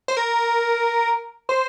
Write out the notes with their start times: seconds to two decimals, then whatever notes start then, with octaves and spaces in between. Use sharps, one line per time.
0.08 C5
0.17 A#4
1.49 C5